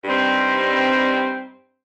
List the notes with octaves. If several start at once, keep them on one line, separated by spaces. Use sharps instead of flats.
G2 G3 C4 D#4